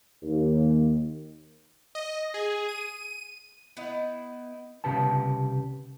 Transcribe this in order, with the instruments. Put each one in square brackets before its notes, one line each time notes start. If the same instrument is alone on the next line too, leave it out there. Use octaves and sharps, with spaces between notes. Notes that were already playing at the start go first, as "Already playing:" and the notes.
[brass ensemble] D#2
[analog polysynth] D#5
G#4
D#7
[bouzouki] B3 D#4 E4 D#5
[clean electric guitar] C2 C#3 G4 B4 A5